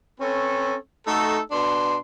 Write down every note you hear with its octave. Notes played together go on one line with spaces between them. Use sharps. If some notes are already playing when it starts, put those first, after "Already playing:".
C4 C#4 A4 B4 C#5
A3 D#4 F#4 A4
B2 D4 C6